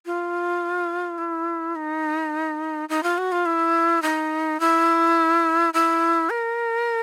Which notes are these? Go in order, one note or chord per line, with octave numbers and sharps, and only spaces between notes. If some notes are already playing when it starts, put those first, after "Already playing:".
F4
E4
D#4
D#4
F4
F#4
F4
E4
D#4
E4
E4
A#4